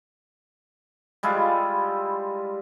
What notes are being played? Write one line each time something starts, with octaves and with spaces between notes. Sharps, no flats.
G3 G#3 E4 F4